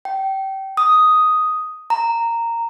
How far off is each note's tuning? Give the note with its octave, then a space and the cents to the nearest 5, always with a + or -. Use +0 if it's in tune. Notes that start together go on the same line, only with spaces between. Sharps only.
G5 -25
D#6 +5
A#5 -10